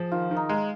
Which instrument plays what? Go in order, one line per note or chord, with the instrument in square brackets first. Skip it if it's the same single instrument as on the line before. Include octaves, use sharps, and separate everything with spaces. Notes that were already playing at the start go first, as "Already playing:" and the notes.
Already playing: [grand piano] F3 [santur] G#4
[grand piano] D#3 [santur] F4
[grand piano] D#3
[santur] D#4
[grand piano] G#3